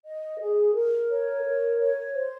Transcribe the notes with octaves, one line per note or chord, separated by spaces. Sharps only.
D#5
G#4
A#4
C#5
A#4
C#5
C5